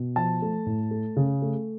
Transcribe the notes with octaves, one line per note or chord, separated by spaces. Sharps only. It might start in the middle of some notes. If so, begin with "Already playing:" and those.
Already playing: B2
F3 A5
A3
A2
A3
C#3
A3